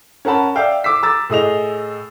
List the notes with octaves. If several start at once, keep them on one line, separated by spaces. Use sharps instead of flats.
C#4 A#4 F#5 A5 B5
D5 E5 F5 G5
D6 E6 B6
A#5 D6 E6 A6
A2 G#4 D#5 F7